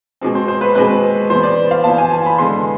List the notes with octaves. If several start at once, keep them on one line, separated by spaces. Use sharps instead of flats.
B2 G#3 C4
C5
C5
B4
B2 G#3 C4 B4
E3 B3 C5
D5
F5
E3 B3 A5
G#5
A5
B5
D3 G#3 B3 C6